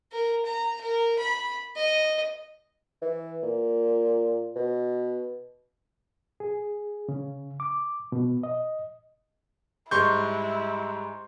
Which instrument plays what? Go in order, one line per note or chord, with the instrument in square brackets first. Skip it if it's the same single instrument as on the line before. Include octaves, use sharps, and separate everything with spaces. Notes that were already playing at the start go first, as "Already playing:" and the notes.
[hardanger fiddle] A#4
A#5
A#4
B5
D#5
[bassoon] E3
A#2
B2
[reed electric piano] G#4
C#3
D6
B2
D#5
[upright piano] G#2 G3 G#3 [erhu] E4 [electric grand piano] C6 C#6 G6